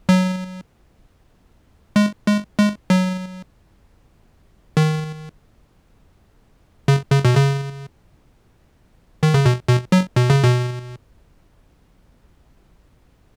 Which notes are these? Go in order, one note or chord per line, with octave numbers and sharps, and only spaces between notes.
F#3
G#3
G#3
G#3
F#3
D#3
C#3
C#3
B2
C#3
D#3
C#3
B2
B2
F#3
B2
C#3
B2